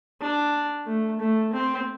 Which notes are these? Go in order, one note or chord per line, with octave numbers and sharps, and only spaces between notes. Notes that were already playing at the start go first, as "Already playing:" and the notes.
D4
A3
A3
C4